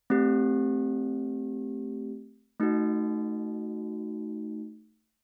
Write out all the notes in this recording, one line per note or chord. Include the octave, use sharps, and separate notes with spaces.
A3 C4 G4
A3 D#4 F#4